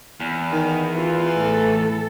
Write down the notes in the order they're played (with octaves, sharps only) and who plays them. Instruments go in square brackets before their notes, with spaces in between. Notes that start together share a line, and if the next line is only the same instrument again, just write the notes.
[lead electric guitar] E2
[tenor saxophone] D#3
[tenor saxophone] E3 [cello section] F4
[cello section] A2 A4